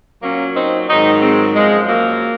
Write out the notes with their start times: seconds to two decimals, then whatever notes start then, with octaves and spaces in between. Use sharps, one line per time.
0.22 A#2 F#3 A#3 C#4
0.56 C4 D#4
0.89 G#2 D#3 F#3 C4 D#4
1.22 G#3 C4
1.55 F#2 F3 G#3
1.88 F#3 A#3